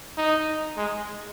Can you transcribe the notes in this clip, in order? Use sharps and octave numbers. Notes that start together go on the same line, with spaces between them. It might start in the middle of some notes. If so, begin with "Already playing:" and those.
D#4
G#3